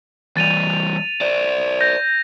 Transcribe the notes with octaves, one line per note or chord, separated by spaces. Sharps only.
E3 G3 A6 D#7 F7
C5 D5
G6 A#6